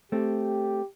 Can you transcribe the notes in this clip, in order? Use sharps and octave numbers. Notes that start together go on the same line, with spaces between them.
A3 C4 G4